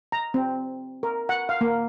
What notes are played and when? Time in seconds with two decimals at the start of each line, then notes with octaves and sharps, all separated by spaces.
0.12 A#5
0.34 C4
1.03 A#4
1.29 F#5
1.49 F5
1.61 A#3